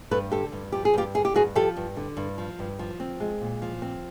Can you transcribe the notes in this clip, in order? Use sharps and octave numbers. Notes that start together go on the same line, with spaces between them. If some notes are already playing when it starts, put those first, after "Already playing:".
G2 A4 B4
D3 G4 A4
G2
F3 G4
G#4
G2 F4 G4
D3 G#4
G4
G2 F#4 G#4
F3 G4 A4
G2
D3
G2
F3
G2
F3
C4
G#3
A#2
F3
C4